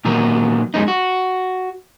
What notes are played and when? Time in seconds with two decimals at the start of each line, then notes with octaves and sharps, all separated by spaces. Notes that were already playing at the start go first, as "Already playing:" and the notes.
0.05 A#2 D#3 F#3 A#3 B3
0.74 F#2 G#3 B3 D#4
0.88 F#4